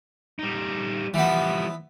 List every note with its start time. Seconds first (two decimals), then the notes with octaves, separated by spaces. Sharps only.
0.39 G3 D#4
1.14 E3 F3 G3 B3